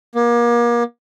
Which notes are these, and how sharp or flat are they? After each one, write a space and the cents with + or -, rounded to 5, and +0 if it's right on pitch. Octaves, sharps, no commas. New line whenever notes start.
A#3 +35